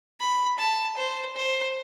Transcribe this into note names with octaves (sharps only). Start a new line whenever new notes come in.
B5
A5
C5
C5